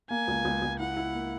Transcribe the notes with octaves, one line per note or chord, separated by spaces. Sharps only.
A#3 G#5
C#2
C#2
C#2
E4 F#5
E4
A#3